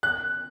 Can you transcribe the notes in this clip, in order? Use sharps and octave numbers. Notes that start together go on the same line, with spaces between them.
F#6